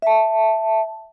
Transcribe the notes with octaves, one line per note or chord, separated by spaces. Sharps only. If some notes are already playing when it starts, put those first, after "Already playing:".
E5 A5